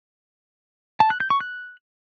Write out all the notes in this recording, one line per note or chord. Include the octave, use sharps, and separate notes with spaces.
A5
F#6
G6
C#6
F#6